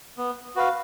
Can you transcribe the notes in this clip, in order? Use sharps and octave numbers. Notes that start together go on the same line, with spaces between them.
B3
F#4 B4 F5